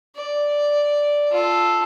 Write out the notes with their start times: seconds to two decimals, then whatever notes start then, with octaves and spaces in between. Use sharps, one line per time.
0.15 D5
1.31 F4 A4